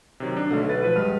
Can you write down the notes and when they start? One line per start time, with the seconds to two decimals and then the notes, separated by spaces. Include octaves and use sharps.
0.20 C3 D#3 F#3
0.37 D4
0.51 B1 D3 A3
0.69 B4 A6
0.83 F3 B4
0.96 G2 G#3 F6